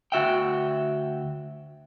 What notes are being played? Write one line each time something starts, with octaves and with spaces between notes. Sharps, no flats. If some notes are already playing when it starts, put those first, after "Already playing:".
D2 F#4 E5 G5